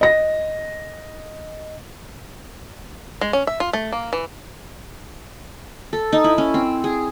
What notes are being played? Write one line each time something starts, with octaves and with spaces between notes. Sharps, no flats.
D#5 A#6
G#3
C#4
E5
F4
A3
A#3
E3
A4
D#4
E4
C#4
C4
G#4